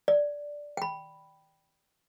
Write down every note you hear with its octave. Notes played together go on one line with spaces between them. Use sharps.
D5
G5 B5